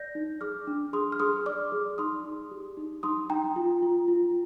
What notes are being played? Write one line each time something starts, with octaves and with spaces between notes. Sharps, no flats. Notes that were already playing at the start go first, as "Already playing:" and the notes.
Already playing: D5 G6 A#6
D#4
G#4 D6 F6
D4
G#4 C6 D#6
F6
G#4 C6 D#6
D5 D6 F6
G#4
D#4 C6 D#6
D#4
G4
D#4
D#4 C6 D#6
D#4 G5 A#5
F4
F4
F4